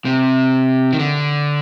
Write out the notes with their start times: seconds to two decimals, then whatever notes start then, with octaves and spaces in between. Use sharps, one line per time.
0.05 C3
0.93 D#3
0.99 D3